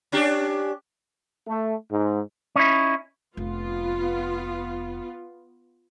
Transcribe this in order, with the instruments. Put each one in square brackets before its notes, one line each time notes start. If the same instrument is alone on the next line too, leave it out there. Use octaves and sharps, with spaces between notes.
[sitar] C#4 D4 G4
[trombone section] A3
G#2
[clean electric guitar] C#4 D#4 E4
[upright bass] F1 [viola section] B3 F4